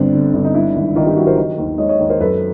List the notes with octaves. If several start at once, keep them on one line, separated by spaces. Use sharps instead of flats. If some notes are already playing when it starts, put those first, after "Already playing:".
Already playing: G1 G2 C4 D4
D3
G1 D4
D#4
G2 D4 E4
G#1
D#3 D#4 F4
F4 G4
F#3 E4 F#4
A#4 C5
D#3
D#2
G#3 C#5 D#5
C#5 D#5
D#2
A#4 C5
F#2 A4 B4